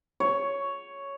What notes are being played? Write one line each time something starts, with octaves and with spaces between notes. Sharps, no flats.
C#5